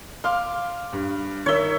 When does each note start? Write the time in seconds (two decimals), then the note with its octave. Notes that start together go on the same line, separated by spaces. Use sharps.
0.24 F5 C6 D6 F6
0.93 G2
1.46 D#3 A#4 C#5 E5 G7